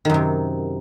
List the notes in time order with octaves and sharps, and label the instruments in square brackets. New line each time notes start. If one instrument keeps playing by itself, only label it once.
[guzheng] D#3
F#2
C3